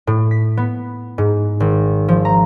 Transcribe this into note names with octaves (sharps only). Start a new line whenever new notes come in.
A2
B6
B3
G#2
G#1
F3
A#5